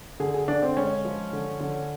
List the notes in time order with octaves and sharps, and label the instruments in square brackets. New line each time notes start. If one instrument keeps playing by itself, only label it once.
[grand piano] D3 G#4
G#4
D3 D4
C4
G#3 C#4
F3
D3
D3